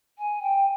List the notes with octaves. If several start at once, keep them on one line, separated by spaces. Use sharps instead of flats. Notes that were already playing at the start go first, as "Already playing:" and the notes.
G#5
G5